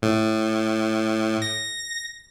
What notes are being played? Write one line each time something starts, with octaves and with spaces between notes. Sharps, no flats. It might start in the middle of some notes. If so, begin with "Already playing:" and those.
A2
A#6